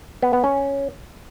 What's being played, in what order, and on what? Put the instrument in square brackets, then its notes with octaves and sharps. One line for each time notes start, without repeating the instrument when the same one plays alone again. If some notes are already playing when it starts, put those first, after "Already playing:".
[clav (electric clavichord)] B3
B3
C#4